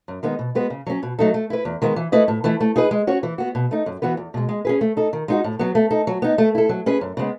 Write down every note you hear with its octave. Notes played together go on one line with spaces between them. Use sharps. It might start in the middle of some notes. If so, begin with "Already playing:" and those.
F#2
D#3 G#3 B3 D#4
B2
G#3 B3 F#4 B4
C#3
F#3 C#4
B2
F#3 A3 D#4 A4
A3
E4 B4
E2
D#3 G#3 B3
E3
A3 E4 B4 D#5
A2
E3 A3 E4
A3
D#4 G#4 B4
G#3
C#4 F#4 C#5
E3
B3 F#4
B2
A3 D#4
F#2
E3 B3 F#4 B4
E2
B2 G#3
G#3
C#4 G#4 B4
A3
D#4 A4
D#3
G#3 D#4 F#4
A2
F#3 B3
A3
D#4 A4
F#3
B3 D#4
A3
E4 A4
F#3
C#4 G#4 B4
F#2
C#3 G#3 B3